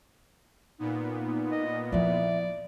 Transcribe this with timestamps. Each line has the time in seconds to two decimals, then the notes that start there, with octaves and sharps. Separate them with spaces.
0.79 A#2 B3 D#4
1.52 D#5
1.92 F3 E4 D5 E5